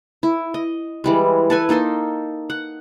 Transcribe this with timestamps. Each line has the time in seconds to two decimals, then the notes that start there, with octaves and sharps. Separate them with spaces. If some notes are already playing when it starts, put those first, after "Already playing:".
0.23 E4
0.54 D#5
1.04 E3 G3 G#3
1.50 A4 B4 G#5
1.69 A#3 D#4 A4 C6
2.50 F#5